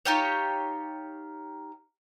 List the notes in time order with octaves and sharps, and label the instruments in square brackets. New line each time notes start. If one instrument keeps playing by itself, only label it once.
[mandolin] D#4 F4 G4 C#5